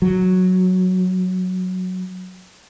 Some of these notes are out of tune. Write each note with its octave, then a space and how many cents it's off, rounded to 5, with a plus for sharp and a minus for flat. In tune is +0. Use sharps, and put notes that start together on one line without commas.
F#3 -5